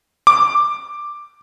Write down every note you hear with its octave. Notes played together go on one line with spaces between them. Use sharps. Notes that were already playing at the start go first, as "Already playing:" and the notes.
D6